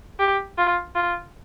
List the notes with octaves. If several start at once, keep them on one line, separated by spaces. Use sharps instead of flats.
G4
F4
F4